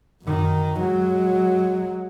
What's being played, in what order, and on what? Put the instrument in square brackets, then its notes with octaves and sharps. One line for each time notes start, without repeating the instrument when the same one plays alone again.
[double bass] F#2 D#3
F#3 G#3